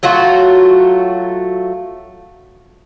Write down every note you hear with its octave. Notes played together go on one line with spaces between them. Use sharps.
F#3 A3 F4 F#4